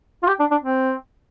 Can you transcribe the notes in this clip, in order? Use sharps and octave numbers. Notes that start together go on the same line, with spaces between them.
F4
G4
D4
D4
C4